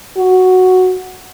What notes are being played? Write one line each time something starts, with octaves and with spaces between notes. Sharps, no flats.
F#4